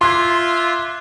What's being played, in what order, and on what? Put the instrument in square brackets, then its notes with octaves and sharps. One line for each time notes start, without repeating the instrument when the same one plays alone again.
[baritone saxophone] F4 [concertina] E5 [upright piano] C6 [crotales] D6 F#6 G#6